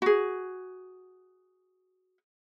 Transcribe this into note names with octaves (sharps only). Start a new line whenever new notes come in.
F#4 G#4